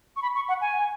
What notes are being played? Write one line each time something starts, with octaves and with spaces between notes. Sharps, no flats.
C#6
B5
C#6
F#5
G#5